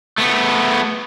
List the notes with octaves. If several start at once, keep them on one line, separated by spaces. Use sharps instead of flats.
A3 B3